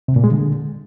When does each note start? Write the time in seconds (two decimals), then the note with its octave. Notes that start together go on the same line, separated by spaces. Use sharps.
0.08 C3
0.16 A#2
0.24 G#3
0.31 D3